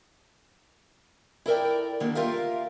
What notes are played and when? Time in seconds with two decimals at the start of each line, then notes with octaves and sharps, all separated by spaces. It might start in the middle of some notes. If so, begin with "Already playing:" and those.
1.46 E4 A4 A#4 D5 G5
2.00 D3 D#3 G3 A#3
2.15 F4 G4 A#4 E5 F5